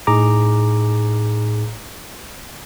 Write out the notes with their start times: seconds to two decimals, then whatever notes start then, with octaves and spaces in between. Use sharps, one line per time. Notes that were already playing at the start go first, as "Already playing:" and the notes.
0.07 A2 D#4 G#4 A#5 D6